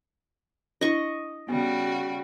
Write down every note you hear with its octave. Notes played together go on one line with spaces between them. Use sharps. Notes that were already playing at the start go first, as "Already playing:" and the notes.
D4 E4 D#5 C#6
C#3 G3 B3 F#4